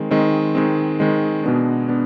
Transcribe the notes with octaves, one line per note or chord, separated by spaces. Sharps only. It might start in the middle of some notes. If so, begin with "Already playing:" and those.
Already playing: D#3 G#3 C4
D#3 G#3 C4
D#3 G#3 C4
D#3 G#3 C4
B2 G#3 B3 D4
B3 D4